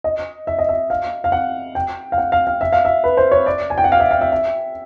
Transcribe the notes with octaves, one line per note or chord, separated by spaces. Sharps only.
D#5
E5
D#5
E5
F5
F5
F#5
G5
F5
F#5
F5
F5
E5
F5
E5
B4
C5
C#5
D5
G#5
G5
F#5
F5
E5
F5
E5
E5